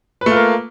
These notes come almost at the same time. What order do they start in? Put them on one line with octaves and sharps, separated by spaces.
B4 A3 F4 A#3